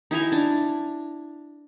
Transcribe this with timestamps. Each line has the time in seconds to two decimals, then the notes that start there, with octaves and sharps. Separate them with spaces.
0.11 D#4 E4 G#5 A#5
0.32 D4